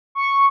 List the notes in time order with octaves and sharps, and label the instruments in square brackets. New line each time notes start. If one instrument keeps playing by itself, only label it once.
[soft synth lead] C#6